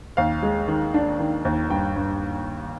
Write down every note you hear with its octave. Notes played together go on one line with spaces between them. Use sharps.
D#2 F5
G#3
D#3
D4
D#3
D#2
G2 G5
G2